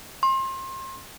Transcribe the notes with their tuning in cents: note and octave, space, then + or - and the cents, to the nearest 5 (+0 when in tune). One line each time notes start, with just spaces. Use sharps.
C6 +30